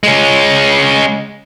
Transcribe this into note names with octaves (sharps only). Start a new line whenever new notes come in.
G#3 C#4